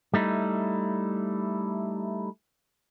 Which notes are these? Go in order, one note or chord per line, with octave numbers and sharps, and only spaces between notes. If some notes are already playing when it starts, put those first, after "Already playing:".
G3 A3 D#4 E4